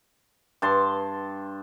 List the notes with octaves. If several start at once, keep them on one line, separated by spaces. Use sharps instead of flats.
G2 A5 C6